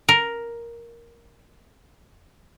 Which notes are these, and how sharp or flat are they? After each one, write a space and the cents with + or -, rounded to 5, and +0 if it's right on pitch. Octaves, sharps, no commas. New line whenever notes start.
A#4 +5